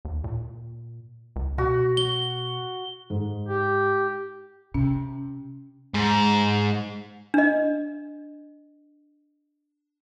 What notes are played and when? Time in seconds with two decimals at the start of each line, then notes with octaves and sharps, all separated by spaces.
0.05 D#2
0.24 A#2
1.36 C#2
1.58 B2 F#4
1.97 G7
3.10 G#2
3.48 G4
4.74 C3 C#4
5.94 G#2
7.34 D4 D#5